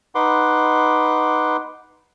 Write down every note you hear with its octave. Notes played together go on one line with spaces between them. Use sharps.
D#4 B4 F#5 C6 D6